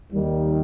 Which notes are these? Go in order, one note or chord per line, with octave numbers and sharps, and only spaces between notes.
D#2 D#3 G3